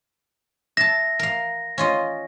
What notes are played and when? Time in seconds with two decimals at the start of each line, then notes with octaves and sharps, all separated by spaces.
0.77 E5 A5 A#6
1.19 A#4 F5
1.78 C#4 F4 D#5